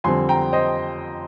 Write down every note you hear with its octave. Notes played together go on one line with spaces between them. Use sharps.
F2 D3 G3 C4 G#5 C6
G5 A#5
C5 D#5